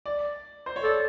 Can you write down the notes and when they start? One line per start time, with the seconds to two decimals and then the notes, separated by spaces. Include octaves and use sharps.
0.06 D5
0.66 C5
0.76 C#5
0.83 A4 D5